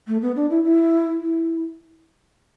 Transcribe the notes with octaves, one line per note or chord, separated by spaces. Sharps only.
A3
B3
D4
E4
E4
E4